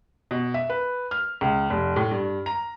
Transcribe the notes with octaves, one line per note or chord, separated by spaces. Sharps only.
B2
E5
B4
F6
C#2
F1
A2
G2
A#5